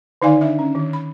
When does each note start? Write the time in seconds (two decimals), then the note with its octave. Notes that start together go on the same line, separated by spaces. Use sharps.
0.22 D3 D#3 D#4 D5 F5 G#5
0.41 D4 E5
0.59 C#4
0.75 D#3
0.93 B5